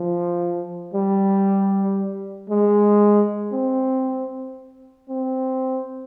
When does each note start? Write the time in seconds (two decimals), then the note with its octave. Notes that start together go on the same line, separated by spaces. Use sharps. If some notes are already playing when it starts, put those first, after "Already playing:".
Already playing: F3
0.94 G3
2.50 G#3
3.52 C4
5.09 C4